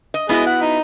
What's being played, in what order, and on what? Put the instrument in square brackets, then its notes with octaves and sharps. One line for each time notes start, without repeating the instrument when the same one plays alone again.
[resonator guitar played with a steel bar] D#5
[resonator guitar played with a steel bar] B3 E4 F#4 [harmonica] G#4 D#5
[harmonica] F#5
D#4